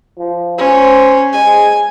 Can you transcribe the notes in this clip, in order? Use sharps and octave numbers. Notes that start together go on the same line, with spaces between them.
F3
C#4 C5
G#3 G#5